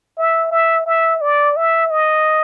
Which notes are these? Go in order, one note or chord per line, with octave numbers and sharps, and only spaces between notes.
E5
E5
E5
D5
E5
D#5